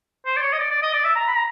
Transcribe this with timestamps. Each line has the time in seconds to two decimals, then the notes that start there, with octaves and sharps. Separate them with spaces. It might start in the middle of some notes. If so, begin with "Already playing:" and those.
0.25 C5
0.37 D5
0.42 C#5
0.53 D#5
0.59 D5
0.71 D5
0.82 D#5
0.93 D5
1.04 E5
1.16 A#5
1.28 B5
1.36 A#5